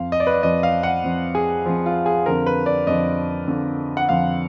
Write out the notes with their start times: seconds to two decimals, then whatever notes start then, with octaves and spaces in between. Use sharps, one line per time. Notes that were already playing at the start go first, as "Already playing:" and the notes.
Already playing: F2 F3 F5
0.12 D#5
0.20 D5
0.27 B4
0.34 D5
0.43 F2 F3 D#5
0.63 F5
0.83 F#5
1.04 F2 F3
1.35 G#4
1.65 F2 F3
1.86 F4
2.06 G#4
2.26 F2 D3 F3 A#4
2.46 B4
2.66 D5
2.87 F2 D3 F3 D#5
3.48 F2 D3 F3
3.97 F#5
4.09 F2 D3 F3 F5